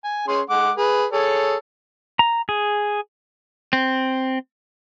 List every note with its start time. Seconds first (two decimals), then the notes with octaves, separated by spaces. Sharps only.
0.04 G#5
0.28 C#4 G#4 C6
0.50 G#3 F#5 D6
0.76 G#4 B4
1.13 G#4 A4 C#5
2.19 A#5
2.49 G#4
3.73 C4